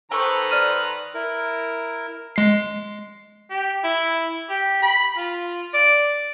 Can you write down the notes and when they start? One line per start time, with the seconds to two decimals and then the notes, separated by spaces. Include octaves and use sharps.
0.12 D#3 A4 B4 C5 A#5 C#6
0.51 D5 F6 D#7
1.14 E4 A#4
2.36 G#3 C7
3.51 G4
3.84 E4
4.50 G4
4.82 B5
5.17 F4
5.74 D5